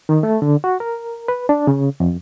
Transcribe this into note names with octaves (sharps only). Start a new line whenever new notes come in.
D#3
A3
D3
F#4
A#4
B4
D4
C#3
F2